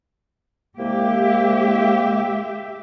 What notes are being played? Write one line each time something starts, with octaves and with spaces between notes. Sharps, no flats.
C2 G#3 A#3 G4 E5